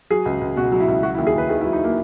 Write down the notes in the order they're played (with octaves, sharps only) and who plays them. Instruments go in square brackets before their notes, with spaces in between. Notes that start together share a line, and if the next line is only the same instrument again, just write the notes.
[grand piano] F#3 G#4
C#2
C#2
B2 F#4
F#3
E4
C#2
F#3 F#4
E4
D#2
G#4
D#2 B4
D#3 G#4
E4
F#3
D#4
A#3